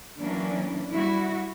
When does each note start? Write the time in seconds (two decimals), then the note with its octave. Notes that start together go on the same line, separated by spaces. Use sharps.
0.19 E3 F#3 A#3 C#4 D4 E4
0.90 G3 E4 F#4